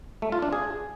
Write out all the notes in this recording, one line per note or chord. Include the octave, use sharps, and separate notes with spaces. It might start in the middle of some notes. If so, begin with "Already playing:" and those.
A3
F4
D4
G#4